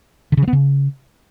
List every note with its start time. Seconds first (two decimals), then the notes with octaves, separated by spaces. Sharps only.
0.32 D3
0.37 C#3
0.42 F3
0.48 B3
0.53 C#3